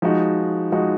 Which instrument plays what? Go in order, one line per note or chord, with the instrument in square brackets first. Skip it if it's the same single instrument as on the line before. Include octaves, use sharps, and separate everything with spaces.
[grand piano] F3 G#3 D#4 F#4
F3 G#3 D#4 F#4